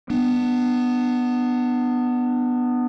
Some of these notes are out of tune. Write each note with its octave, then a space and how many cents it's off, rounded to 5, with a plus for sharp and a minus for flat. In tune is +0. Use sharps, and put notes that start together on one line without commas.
B3 +0 D4 +25